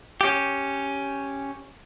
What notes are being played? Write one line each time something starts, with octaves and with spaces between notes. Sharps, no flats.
C#4 G4